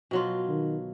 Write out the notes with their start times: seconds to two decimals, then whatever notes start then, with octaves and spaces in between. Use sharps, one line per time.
0.11 B2 F#3 F4
0.48 D#3